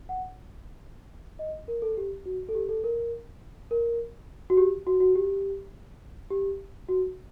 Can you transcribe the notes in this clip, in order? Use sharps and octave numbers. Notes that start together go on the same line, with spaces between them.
F#5
D#5
A#4
A4
G4
F#4
A4
G4
A4
A#4
A#4
F#4
G4
F#4
F#4
G4
G4
F#4